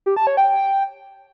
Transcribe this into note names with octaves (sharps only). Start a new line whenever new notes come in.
G4
A5
C#5
G5